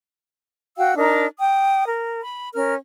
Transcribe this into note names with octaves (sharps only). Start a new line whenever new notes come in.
F#4 F5 G5 E6
D4 D#4 A#4
G5 D#6
A#4
B5
C#4 A#4 F6